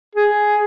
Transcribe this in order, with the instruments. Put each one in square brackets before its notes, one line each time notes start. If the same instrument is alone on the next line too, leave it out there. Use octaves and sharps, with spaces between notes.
[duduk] G#4